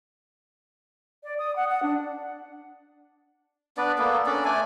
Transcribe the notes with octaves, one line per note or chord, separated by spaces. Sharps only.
D5
D#6
F#5
F#5
D4
B3 D4 B4 D5
A#3 B3 A4
C#4 D4 A4 D5
A3 D5 G#5